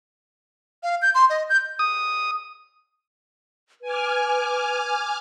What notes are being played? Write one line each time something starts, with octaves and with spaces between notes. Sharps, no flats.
F5
G6
C6
D#5
G6
D#6
B4 G#5 D6 F6